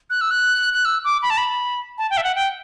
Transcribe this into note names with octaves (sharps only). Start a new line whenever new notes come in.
F#6
E6
F#6
F#6
E6
D6
B5
A5
B5
A5
G5
E5
F#5
G5